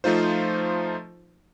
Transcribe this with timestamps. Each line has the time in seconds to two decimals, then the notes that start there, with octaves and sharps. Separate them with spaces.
0.04 F3 A3 D#4 F4 C5